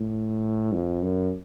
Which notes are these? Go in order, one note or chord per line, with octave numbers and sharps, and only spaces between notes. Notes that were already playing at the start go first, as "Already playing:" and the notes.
Already playing: A2
F2
F#2